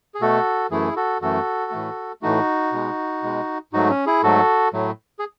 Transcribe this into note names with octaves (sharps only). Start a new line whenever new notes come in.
G#4
B2 A3 F#4 A4
F#2 E3 A3 E4 G#4
F#4 A4
F#2 E3 A3 F#4 A4
A2 E3 A3
A2 E3 A3 D#4 F#4
B2 G#3
B2 G#3
G#2 F#3 A3 D#4 F#4
C#4
E4 G#4
G#2 F#3 A3 F#4 A4
A2 F#3 A3
G#4